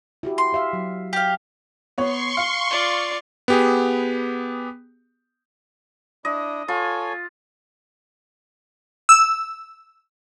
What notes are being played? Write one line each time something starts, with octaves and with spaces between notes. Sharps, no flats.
E4 F#4 G4
C6
G4 E5 F5
F#3
G4 F5
B3 C#5 C6 C#6
F5
F4 D5
B3 G4 G#4
D4 E4 D#5
F4 A4 C#5 G#5
E6